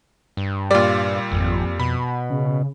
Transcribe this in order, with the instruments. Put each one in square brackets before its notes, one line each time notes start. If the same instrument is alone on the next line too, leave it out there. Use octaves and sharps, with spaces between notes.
[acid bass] G2
[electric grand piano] A#2 G3 [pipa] F4 D5
[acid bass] G#1 [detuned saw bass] F2
[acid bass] B2 [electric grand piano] B5
[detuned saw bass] C#3